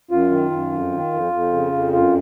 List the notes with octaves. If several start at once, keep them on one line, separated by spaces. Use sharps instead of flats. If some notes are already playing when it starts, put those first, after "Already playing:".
F#2 F4
D#3
F#2
F2
D#3
F2
F2
C#3
F2
F#2 F4